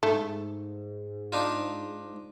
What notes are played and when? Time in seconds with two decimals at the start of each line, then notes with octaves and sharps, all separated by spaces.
0.03 G#2 A3
1.32 D4 D#4 F4